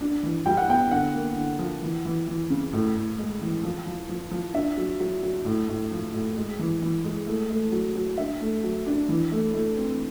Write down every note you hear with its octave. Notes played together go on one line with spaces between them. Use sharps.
D4
E3
G3 G5
F#5
B3 G5
D3 F#5
A#3
D3
F3
E3
E3
E3
C#3
A2
A2
G#3
E3
F3
F3
F3
F3
D4 E5
F#3
F#3
F#3
A2
A2
F3
A2
G#3
E3
E3
G#3
A3
A3
F#3
F#3
D4 E5
A3
F#3
D4
E3
A3
A3
C4